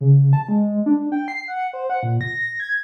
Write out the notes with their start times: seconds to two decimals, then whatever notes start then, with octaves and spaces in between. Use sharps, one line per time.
0.01 C#3
0.33 A5
0.49 G#3
0.86 D4
1.12 G5
1.28 C7
1.48 F#5
1.73 C5
1.90 F#5
2.03 A#2
2.21 A#6
2.60 G#6